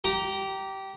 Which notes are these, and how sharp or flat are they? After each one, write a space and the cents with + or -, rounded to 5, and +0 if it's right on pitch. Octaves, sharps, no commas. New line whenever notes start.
G4 -20 A#5 +0